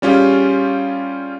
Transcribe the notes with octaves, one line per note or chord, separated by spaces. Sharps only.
G3 C#4 F4 G4 G#4